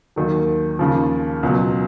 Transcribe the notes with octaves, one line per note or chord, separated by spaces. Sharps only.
D#2 D#3 F#3
D#2 C#3 F3
C#2 B2 F#3